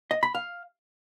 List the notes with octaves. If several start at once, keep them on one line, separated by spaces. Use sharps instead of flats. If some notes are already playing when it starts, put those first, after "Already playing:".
D#5
B5
F5